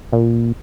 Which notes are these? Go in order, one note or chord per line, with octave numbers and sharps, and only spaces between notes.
A#2